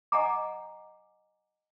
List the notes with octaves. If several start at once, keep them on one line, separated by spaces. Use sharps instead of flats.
D#5 F#5 G#5 A#5 D6